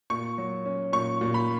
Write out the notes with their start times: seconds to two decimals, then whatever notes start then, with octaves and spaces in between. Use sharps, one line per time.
0.10 A#2 C#6
0.38 F#3
0.66 C#4
0.93 A#2 C#6
1.21 A#2
1.34 B5